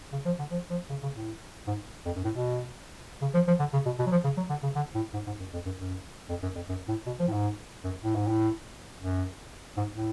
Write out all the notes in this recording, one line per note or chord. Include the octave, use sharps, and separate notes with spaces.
C#3
F3
D3
F3
F3
C#3
C#3
A2
G#2
F2
F#2
A2
B2
C#3
F3
F3
D3
C#3
B2
B2
F#3
F3
C#3
F#3
D3
C#3
D3
A2
G#2
G#2
F#2
F2
F#2
F#2
F2
F#2
F2
F#2
A2
B2
F3
A2
G#2
F#2
A2
G#2
A2
F#2
G#2
A2